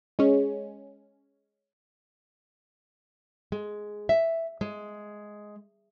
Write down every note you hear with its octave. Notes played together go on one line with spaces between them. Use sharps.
G#3 C#4
G#3
E5
G#3